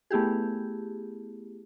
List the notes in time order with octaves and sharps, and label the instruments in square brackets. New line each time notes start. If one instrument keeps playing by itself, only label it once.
[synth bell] A3 B3 E4 G4 G#4